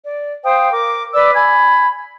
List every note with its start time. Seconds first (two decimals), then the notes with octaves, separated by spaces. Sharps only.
0.05 D5
0.44 C5 F5 G5 D#6
0.71 A#4 D6
1.14 B4 D5 D6 E6
1.35 G#5 B5 G#6